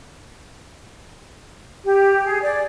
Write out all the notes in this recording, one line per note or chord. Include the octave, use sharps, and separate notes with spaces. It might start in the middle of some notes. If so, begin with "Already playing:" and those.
G4
G#4
D5